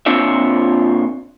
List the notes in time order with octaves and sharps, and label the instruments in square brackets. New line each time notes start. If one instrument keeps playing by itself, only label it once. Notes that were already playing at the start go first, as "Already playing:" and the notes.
[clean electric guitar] A#2 C4 D4 F4 C#5 E5